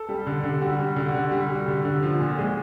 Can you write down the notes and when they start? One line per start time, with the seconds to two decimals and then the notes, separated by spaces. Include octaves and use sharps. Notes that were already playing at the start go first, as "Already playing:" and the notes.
Already playing: A4
0.09 G3
0.27 D3
0.43 D3
0.61 G3 F#4
0.78 G3
0.96 D3
1.08 F#4
1.14 D3
1.32 G3
1.49 G3
1.68 D3
1.85 D3
2.03 F3
2.20 A#2
2.39 G#3